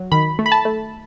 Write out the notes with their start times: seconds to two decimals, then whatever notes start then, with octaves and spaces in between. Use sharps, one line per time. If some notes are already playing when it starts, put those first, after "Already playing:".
Already playing: F#3
0.12 D#3 B5
0.39 A3
0.46 B5
0.52 A5
0.65 A3